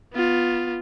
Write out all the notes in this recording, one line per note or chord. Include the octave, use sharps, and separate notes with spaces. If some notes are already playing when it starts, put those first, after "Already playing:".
B3 F4